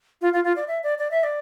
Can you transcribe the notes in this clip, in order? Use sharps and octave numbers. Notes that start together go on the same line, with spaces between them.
F4
F4
F4
D5
E5
D5
D5
E5
D5